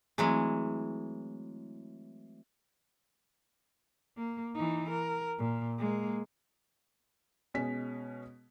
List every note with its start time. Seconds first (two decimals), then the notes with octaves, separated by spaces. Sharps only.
0.18 E3 F#3 G#3 A3 C4 E4 G#4
4.17 A#3
4.55 E3 D#4
4.91 A#4
5.38 A#2
5.78 G#3 A#3
7.54 B2 G#3 C#4 B6